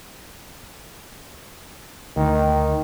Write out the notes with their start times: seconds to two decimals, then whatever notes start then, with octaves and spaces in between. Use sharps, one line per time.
2.17 D2 D#3